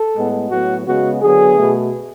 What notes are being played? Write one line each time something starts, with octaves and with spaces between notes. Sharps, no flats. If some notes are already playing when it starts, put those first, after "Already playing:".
Already playing: A4
A2 G#3 B3
A2 F#3 B3 F#4
C#3 G#3 B3 F#4
D3 F#3 B3 G#4
B2 A3